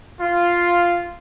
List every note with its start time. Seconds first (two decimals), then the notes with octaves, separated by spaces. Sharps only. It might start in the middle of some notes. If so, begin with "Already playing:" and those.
0.21 F4